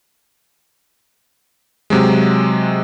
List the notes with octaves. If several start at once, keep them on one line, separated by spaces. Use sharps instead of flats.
C3 F#3 G#3